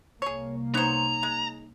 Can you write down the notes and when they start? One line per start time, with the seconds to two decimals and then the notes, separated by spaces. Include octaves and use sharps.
0.22 C2 A#3 G#4 C#5
0.74 B3 D#4 C5 C#5 A#5
1.23 G#3